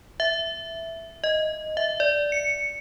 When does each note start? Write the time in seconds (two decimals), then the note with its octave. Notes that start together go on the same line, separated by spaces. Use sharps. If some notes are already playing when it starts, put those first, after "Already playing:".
0.20 E5
1.24 D#5
1.77 E5
2.00 D5
2.32 C#7